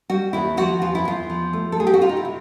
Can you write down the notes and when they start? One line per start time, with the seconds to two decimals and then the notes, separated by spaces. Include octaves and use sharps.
0.10 G3 F#4
0.33 D#2 E4
0.57 F3 F#4
0.82 E2 F4
0.95 E4
1.05 E2 F4
1.30 F3
1.53 A3
1.72 A4
1.77 A3 G#4
1.87 G4
1.94 F#4
2.01 C3 F4
2.09 D#4
2.17 E4
2.25 C3